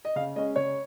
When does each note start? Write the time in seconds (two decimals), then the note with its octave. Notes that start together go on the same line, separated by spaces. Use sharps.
0.05 D#5
0.16 C#3 F5
0.36 G#3 C#4 D#5
0.56 C#3 C#5